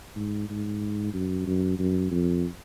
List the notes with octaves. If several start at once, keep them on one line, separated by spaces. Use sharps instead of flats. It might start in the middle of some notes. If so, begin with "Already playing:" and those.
G#2
G#2
F#2
F#2
F#2
F2